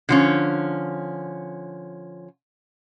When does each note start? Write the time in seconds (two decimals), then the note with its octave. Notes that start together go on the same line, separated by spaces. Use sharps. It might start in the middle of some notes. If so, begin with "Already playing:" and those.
0.09 D3 F3 C#4